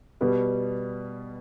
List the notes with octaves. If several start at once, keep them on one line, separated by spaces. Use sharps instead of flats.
B2 G3 B3